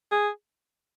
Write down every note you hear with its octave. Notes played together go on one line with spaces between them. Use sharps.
G#4